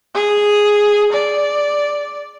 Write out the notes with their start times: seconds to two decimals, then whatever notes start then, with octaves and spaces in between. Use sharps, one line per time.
0.15 G#4
1.12 D5